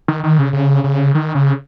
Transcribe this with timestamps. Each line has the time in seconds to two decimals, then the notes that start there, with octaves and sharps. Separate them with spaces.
0.08 D#3
0.24 D#3
0.39 C#3
0.53 C#3
0.84 C#3
1.15 D#3
1.35 C#3